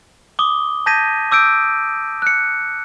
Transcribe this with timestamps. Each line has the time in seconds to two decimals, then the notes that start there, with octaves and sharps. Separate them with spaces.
0.39 D6 D#6 G7
0.86 A5 G6 G#6 A#6 B6 D#7
1.31 D6 E6 G6 D7
2.22 F#6 C#7